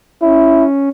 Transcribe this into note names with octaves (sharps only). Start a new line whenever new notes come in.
C#4 E4